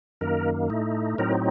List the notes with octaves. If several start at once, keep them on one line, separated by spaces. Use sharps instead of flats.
F#2 D#3 A#3 A#4
A2 A3 D#4
A2 F#3 C4 D#4 A#4